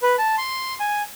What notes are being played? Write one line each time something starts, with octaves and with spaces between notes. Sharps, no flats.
B4
A5
C6
G#5